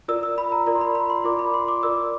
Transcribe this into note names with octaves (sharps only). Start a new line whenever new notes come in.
F4 A#4 D5 E6
E6
B5
A#5
F4 A#4 D5 A#5
C6
B5
B5
C6
F4 A#4 D5 D6
B5
C6
D6
F4 A#4 D5 E6